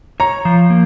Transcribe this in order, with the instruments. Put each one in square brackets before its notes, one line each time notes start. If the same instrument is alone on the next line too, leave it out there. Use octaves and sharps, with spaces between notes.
[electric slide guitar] C#5 [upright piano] A#5
[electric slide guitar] F3
A#3